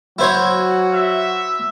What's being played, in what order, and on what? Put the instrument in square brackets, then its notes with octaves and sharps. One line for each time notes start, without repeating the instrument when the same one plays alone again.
[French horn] F#3 [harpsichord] E4 C5 C#5 [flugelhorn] F#4
[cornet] E5